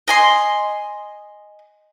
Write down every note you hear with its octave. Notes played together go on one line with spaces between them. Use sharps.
D#5 G#5 C6